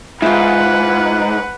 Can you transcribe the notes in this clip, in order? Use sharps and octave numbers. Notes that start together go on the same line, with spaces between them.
G#2 E4 F4 B4 F#5